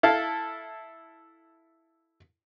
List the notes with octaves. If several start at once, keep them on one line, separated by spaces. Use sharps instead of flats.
E4 A4 F5